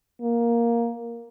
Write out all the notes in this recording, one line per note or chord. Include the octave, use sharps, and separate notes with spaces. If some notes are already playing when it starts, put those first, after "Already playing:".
A#3